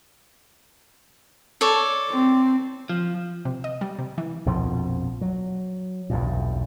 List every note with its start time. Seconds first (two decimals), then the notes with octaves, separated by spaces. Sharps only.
1.61 A4 C#5 D5
2.10 C4
2.89 F3
3.45 C3
3.64 D#5
3.81 G3
3.99 C3
4.18 E3
4.46 A#1 F2 B2 F3
5.21 F#3
6.10 B1 E2 G2 A#2